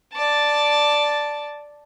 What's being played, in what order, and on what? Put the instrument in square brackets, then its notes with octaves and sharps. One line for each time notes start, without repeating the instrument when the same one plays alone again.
[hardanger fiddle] D5 A5